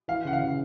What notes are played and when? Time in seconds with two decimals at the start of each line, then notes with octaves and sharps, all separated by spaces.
0.08 E3 F5
0.25 C#3 F#5
0.33 F5
0.41 C#3